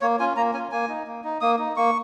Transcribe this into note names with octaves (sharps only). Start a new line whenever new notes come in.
A#3 C#5
C#4 F4 G#5
A#3 A#5
C#4 F4 G#5
A#3 G#5
D#4
A#3
D#4
A#3 D#6
D#4
A#3 C#6